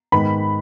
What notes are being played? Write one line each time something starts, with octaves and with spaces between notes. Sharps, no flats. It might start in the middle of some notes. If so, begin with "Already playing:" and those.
G#2 D#3 B3 B5